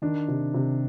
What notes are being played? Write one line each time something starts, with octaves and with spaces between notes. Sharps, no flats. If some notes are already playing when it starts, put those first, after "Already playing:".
D#3 D4
C3
C3